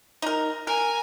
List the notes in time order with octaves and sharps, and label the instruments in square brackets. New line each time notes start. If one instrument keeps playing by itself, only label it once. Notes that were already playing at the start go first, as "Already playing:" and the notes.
[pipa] D#4 A#4
[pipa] A#4 [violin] G#5 A#5